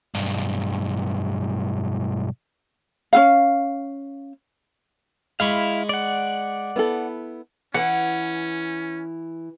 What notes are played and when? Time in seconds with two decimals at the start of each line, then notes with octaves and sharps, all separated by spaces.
0.14 B1 G2
3.13 C#4 F4 F5
5.40 G#3 E4 F5 B5 C#6
5.89 D5 F#5
6.76 B3 E4 A4
7.74 E3 C#4 F#5